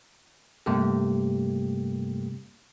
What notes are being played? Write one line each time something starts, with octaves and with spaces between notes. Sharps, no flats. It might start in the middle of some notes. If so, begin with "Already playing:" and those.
G2 C3 G3 A3 A#3 G4